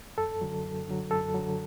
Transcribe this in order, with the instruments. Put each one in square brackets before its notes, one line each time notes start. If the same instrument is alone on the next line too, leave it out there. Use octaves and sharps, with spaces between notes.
[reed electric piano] F#2 A4
D3 F#3
F#2
D3 F#3
F#2 A4
D3 F#3